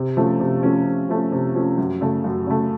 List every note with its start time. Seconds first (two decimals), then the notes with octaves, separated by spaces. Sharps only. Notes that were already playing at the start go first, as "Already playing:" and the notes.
Already playing: C3
0.17 F3 A3 C#4
0.40 C3
0.63 F3 A3 C#4
0.86 C3
1.09 F3 A3 C#4
1.32 C3
1.55 F3 A3 C#4
1.78 F#2
2.01 C#3 A3
2.24 F#2
2.47 C#3 A3